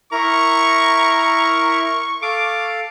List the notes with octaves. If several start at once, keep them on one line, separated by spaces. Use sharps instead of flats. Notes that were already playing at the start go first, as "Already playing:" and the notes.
E4 A#4 A#5 C#6
A4 F5 D6